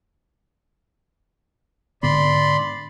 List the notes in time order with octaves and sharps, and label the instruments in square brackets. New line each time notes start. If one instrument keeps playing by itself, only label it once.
[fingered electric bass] G#2 D3 B3 [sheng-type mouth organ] D5 B5 C6